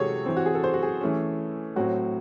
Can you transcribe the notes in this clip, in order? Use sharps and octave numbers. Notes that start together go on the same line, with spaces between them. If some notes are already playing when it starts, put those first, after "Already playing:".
Already playing: C3 E3 G#3 F#4 G#4 A4 C#5
E3 C4
F#4
G#4
A4
C5
F#4
G#4
E3 A3 C#4
A2 F#3 C4 F#4